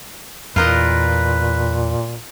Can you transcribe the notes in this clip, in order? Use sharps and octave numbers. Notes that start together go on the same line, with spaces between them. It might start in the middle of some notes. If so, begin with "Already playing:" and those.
E2 A#2 F4 A#4 B4 D#5